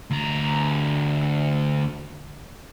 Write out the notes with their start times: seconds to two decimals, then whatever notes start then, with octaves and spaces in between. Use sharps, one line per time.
0.11 D2 A#5